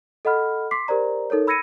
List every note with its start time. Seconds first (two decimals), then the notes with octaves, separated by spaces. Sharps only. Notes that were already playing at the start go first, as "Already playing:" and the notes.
0.25 A4 D#5 F#5 B5 F6
0.71 C6 D6 B6 C7
0.88 G4 A#4 C5 D5 A#5
1.30 D#4 A4 A#4 C#5
1.47 B5 E6 G#6 A#6 C#7 D#7